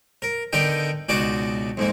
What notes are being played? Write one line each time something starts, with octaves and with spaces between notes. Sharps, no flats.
A#4
D3 B3 D#4 A#4 G5
C#2 B2 D#4 F#4 D5 D6
F2 G#2 A#3